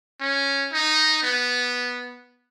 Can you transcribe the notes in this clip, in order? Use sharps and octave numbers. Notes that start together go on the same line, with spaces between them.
C#4
D#4
B3